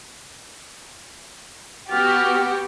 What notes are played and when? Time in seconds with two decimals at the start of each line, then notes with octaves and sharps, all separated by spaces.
1.90 B3 F#4 G4 F6 A6